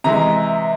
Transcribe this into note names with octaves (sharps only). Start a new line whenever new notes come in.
C3 E3 G#3 A#5